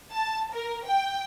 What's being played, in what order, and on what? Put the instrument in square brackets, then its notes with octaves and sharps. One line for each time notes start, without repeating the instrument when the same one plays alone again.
[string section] A5
A#4
G5